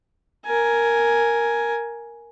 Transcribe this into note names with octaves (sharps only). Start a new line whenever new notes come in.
A#4 G#5